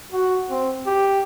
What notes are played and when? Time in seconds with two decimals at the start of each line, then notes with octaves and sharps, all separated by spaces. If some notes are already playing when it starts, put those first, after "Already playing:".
0.12 F#4
0.50 C4
0.86 G4